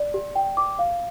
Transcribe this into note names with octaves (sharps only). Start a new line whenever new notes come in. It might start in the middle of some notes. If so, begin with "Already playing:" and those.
Already playing: D5
G4
G5
D6
F5